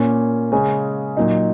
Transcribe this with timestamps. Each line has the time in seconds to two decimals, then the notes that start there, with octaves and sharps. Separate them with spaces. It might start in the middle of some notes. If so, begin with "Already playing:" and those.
Already playing: A#2 A#3 C#4
0.52 C#3 G#3 C#4
1.17 A#2 F#3 D#4